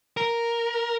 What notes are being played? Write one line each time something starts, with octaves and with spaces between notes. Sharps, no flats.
A#4